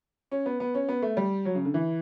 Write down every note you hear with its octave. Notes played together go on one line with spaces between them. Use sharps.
C#4
B3
B3
C#4
B3
A3
G3
F#3
C#3
D3
E3